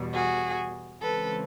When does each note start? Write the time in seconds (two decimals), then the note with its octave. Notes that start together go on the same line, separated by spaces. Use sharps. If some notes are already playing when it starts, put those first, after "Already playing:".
Already playing: E2 B2 G3
0.13 F#4 G#4
1.01 C#3 E3 G#3 C4 A4 B4